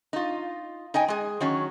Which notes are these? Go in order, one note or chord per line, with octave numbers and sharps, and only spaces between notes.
D#4 F4
D#4 D#5 G5 G#5
G#3 G#4
D#3 F#3 C#4